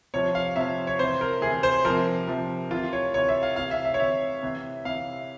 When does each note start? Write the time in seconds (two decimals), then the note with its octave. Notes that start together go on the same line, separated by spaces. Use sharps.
0.14 C3 F3 C#5
0.35 F5
0.56 C3 F3 E5
0.87 C#5
0.99 C3 E3 C5
1.21 A#4
1.42 C3 E3 G#4
1.63 C5
1.85 F3 A#4
1.90 C3
2.27 C3 F3
2.71 C3 E3 F4
2.93 C#5
3.14 C3 E3 C#5
3.29 E5
3.43 F5
3.56 C3 E3 F5
3.71 E5
3.85 E5
3.94 C#5
4.00 C3 E3 E5
4.43 C3 E3
4.85 C3 E3 F5